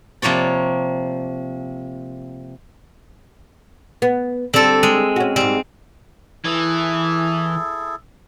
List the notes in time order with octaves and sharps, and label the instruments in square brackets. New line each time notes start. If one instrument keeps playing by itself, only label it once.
[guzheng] C3 F3 A#3 C#5 D5
[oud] B3
[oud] D3 G3 [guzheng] C4 A4
[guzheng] G#3
[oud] C#4 F#4
[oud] G#2 G3 [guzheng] C4
[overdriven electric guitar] E3 [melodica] E4 G#4 A4